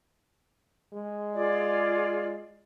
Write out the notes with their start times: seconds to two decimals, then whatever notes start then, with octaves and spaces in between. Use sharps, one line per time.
0.93 G#3
1.34 F4 G#4 D5